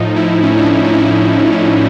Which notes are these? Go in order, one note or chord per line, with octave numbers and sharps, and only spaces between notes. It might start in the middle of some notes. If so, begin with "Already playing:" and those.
Already playing: A2 F3 D#4
E4
C#4
D4
D4
D#4
E4
D#4